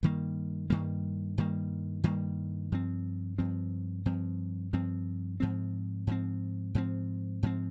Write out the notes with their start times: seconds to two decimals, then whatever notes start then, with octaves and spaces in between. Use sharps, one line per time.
0.03 G2 D#3 G3 A#3
0.70 G2 D#3 G3 A#3
1.38 G2 D#3 G3 A#3
2.04 G2 D#3 G3 A#3
2.72 G2 F3 C4
3.38 G2 F3 C4
4.05 G2 F3 C4
4.73 G2 F3 C4
5.40 G#2 F3 C4
6.07 G#2 F3 C4
6.75 G#2 F3 C4
7.43 G#2 F3 C4